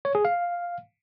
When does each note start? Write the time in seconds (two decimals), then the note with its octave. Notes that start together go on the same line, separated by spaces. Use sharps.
0.05 C#5
0.15 G#4
0.25 F5